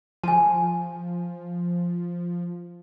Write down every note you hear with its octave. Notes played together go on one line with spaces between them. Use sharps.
F3 G#5 A5